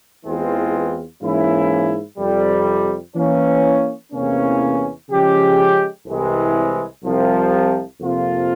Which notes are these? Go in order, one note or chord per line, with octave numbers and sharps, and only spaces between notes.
E2 E3 G#3 C4 F4
G#2 E3 A#3 C#4 E4
F2 C3 G3
E3 A#3 C#4
E2 C3 E3 A#3 C#4
C#3 F3 G#3 C#4 G4
C2 C3 E3 G#3
C2 C3 F3
F2 C3 F3 A#3 F4